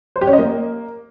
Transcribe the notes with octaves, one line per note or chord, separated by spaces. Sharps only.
C5
G4
C#4
D#5
A#3